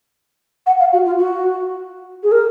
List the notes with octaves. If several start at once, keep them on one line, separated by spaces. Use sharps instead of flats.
F#5
F5
F#4
F4
F#4
G#4
A#4